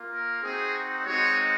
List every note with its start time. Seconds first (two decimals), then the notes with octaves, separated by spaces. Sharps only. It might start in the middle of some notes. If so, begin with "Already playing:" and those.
Already playing: A#3 F4
0.12 A#4
0.42 C4 D#4 F#4 G#4
1.05 G#3 C4 D#4 F#4 C#5